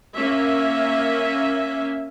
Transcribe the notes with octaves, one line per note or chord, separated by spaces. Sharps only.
A#3 C#4 E5